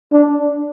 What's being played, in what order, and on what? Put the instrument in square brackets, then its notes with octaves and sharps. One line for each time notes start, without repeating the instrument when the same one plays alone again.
[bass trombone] D4